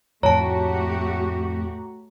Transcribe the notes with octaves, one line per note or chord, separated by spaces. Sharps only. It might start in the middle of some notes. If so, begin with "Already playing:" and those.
F2 A2 A3 F#4 G4 C#5 A5 A#5